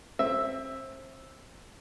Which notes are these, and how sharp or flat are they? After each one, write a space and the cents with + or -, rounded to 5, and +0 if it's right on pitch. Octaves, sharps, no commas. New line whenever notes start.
C4 +30 E5 +0